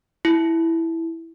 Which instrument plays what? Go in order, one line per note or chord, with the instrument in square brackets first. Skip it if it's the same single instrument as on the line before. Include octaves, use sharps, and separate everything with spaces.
[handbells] E4